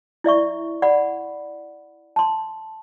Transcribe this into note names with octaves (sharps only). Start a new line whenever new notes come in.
E4 D5 E5 C#6
D5 F#5 B5
A5 C6